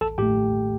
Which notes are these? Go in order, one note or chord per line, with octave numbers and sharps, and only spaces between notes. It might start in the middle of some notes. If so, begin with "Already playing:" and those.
A1 A4 A5
A2 A3 G4 G5